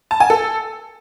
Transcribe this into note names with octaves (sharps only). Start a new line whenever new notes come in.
A5
G#5
A4